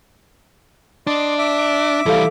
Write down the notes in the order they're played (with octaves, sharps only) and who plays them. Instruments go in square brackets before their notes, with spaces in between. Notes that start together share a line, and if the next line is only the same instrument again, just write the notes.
[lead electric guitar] D4 [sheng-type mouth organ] D#5 C6 D6
[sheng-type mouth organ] E5 D6
[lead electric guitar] E3 G3 [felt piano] A4 F5